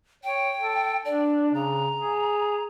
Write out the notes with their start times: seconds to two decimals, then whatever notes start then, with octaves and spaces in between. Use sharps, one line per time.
0.24 C#5 G5
0.60 A4
1.05 D4 D5
1.54 C#3 A#5
1.97 G#4